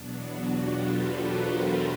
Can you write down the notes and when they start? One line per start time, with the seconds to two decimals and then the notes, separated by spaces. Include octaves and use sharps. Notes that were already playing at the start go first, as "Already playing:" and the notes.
Already playing: E2 B2 F#3 B3 D4
0.15 F#4
0.44 F4 G4
0.74 A4 B4
1.04 A#4 C5